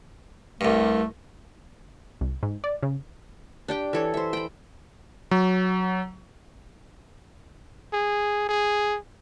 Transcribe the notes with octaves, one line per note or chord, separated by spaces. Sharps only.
C2 G2 A3
C2
G#2
D5
C#3
D4 G4 G5
E3 A4 C#5
C5 E5
G5 B5
F#3
G#4
G#4